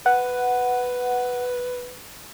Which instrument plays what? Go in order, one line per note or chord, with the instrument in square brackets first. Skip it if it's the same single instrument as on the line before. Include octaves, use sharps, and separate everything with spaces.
[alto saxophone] B4 [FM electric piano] F#5